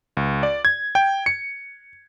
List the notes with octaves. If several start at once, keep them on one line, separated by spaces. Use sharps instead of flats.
C#2
D5
G#6
G5
C#7